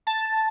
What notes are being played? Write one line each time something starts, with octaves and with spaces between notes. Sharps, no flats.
A5